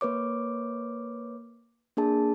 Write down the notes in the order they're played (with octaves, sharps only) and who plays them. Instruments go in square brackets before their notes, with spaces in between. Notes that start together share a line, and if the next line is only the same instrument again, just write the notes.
[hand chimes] A#3 B4 C#5 D6
A#3 D4 G#4 A5